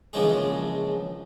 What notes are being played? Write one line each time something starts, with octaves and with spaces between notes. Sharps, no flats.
A#1 C#3 E3 F3 G#3 G#4